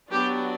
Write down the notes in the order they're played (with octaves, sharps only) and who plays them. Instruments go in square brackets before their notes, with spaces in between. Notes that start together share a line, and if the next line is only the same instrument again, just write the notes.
[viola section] F#3 B3 D4 G4